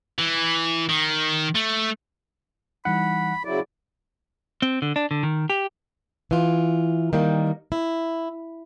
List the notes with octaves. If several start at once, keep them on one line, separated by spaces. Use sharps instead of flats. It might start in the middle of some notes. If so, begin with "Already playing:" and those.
E3
D#3
A3
E3 G3 D#4 F#5 B5
C#3 F#3 E4 D5
C4
D3
D4
D3
D#3
G4
E3 F4
D#3 G3 A#3
E4